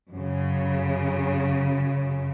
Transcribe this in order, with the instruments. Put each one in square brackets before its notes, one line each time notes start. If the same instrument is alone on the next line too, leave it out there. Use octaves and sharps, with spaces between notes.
[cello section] F#2 C#3